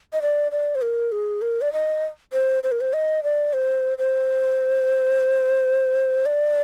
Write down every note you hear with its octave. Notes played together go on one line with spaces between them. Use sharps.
D#5
D5
D5
C5
A#4
G#4
A#4
D5
D#5
C5
C5
A#4
C5
D#5
D5
C5
C5
D5